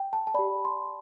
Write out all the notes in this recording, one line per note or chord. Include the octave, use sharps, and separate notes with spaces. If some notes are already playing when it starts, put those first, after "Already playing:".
Already playing: G5
A5
A5
G4 D5 B5
C6